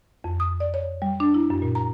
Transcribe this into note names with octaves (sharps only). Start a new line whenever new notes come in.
F2
D#6
D5
C#5
G3
D4
E4
F#2
A#2
A#5